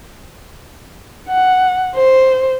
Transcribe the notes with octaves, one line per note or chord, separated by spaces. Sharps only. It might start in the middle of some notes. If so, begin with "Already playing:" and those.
F#5
C5